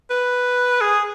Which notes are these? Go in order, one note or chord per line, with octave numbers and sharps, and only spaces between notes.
B4
G#4